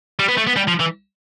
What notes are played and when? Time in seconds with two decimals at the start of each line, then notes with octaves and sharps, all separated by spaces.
0.19 G3
0.29 B3
0.37 A3
0.47 B3
0.56 G3
0.68 F3
0.80 E3